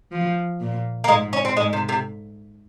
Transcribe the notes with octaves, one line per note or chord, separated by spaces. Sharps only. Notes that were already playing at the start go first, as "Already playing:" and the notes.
F3
A#2
A#3
G#2 G#3
C#4
C4
G#2 G#3
C3
C3